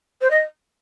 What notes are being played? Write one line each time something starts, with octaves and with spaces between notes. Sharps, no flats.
C5
D#5